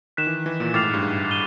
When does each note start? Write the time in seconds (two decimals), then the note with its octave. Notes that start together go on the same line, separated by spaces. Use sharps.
0.17 D#3 F#6 B6 E7
0.27 E3
0.46 E3
0.60 A#2
0.74 A2 D6 F6 A6 C7 F7
0.83 G#2
0.94 G2
1.02 G#2
1.31 D#7 G7